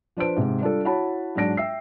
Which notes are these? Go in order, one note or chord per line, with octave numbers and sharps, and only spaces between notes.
F3 D4 B4 C5 D7
G#2 C3
G3 D4 F4 A4
E4 F#4 C#5 F#5 A5 B5
G#2 F#3 D4 A#6 D7
E5 G5 E6 C7